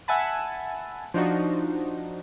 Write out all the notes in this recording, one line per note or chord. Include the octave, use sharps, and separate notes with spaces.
E5 F#5 G#5 A5 B5
F3 D4 D#4 F#4